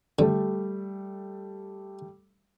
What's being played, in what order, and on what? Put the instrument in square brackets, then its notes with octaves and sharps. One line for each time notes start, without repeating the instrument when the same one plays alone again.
[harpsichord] D3 [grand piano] G3 A3